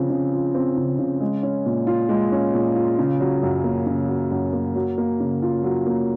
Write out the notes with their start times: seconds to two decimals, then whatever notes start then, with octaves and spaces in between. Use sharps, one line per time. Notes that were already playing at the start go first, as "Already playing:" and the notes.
Already playing: C#3 F3 C4
0.10 C#3
0.32 F3
0.55 C4
0.77 C#3
0.99 C#3
1.20 G#3
1.43 C#4
1.66 A#2
1.87 F4
2.09 G#3
2.32 C#4
2.54 A#2
2.76 F4
2.99 C#3
3.20 F#3
3.43 F#2
3.64 A#3
3.86 C#3
4.08 F#3
4.31 F#2
4.53 A#3
4.75 F#3
4.98 A#3
5.20 C#3
5.42 F4
5.64 F#3
5.87 A#3